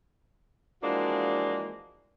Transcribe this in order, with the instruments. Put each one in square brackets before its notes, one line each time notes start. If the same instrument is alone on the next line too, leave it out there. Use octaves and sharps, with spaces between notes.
[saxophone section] E3 F3 G#3 A#3 D4 F#4